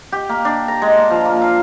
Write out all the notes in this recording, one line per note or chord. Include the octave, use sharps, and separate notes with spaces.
G4
A#3
D4
A#5
G#3
A#3
F3
A#3
F5